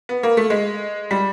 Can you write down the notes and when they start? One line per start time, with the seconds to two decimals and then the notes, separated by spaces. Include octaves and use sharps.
0.09 B3
0.23 A#3
0.37 A3
0.50 G#3
1.11 G3